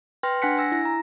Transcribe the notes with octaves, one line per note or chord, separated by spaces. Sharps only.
B4 G5 C6 F6 A#6
D4 F#5 G#5 F#6 B6 C#7
G#5 E6 A#6
E4 A#6
A#5